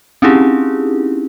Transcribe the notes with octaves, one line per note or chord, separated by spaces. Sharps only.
C4 C#4 D#4 E4 G4 G#4